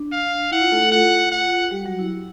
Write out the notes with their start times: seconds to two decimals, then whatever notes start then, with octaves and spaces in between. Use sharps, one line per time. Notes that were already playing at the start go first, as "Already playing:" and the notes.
Already playing: D4
0.12 F5
0.51 E4 F#5
0.61 F4
0.72 A3 A4
0.82 A3 A4
0.92 F4 F#5
1.32 F#5
1.71 G3 G4
1.84 F#3 F#4
1.99 E4